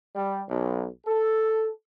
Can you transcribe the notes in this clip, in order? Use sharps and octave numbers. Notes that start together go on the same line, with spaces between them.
G3
B1
A4